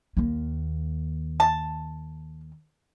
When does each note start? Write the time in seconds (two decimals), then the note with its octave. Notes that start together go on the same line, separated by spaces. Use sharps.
0.17 D#2 A#3
1.40 A5